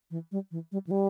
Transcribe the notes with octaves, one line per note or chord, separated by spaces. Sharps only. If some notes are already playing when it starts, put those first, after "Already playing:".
E3
G3
E3
G3
E3
G3